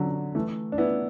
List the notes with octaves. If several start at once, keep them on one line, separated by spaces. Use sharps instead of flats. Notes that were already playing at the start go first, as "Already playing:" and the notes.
Already playing: D3 F#3
E3 A3
D4
B3 E4